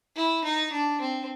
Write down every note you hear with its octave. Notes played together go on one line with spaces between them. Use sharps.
E4
D#4
D4
C4